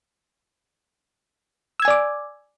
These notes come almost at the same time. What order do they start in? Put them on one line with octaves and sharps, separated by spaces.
E6 G#6 G#5 D5 D6